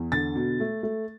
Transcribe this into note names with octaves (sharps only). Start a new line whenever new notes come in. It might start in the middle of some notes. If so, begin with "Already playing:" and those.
Already playing: E2
D3 A6
B2
A3
A3